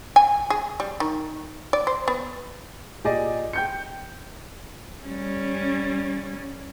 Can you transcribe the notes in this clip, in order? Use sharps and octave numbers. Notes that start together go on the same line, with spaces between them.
G#5
G#4
G3
D#3
D5
C5
B3
A#2 G4 G#4 D5 D#5
G5 G6 C#7
G3 C#4